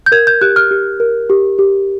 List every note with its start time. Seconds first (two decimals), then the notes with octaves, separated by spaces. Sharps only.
0.06 G6
0.12 A#4 G#6
0.27 G6
0.41 G4 F#6
0.56 F6
0.71 G4
1.00 A#4
1.30 G4
1.59 G4